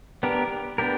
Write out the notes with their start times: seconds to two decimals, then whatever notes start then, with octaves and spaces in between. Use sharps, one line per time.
0.23 B3 D4 G4 A#4
0.78 B3 D4 G4 A#4